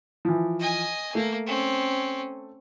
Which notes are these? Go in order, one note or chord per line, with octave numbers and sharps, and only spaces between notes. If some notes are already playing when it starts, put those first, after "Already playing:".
E3 F3
D#5 G#5
A3 A#3
C4 C#4